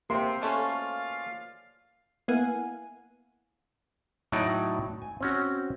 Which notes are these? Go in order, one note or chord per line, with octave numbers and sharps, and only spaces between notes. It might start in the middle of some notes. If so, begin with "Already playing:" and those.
C3 A#3 C5 C6
B2 A3 C#4 F4 D5 F5
A#3 B3 E4 F5 F#5 G#5
A2 F#3 D#4 D5
G#5
C4 C#4 F#4